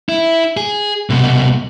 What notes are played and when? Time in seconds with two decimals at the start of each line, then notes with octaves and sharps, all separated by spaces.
0.09 E4
0.57 G#4
1.10 C2 B2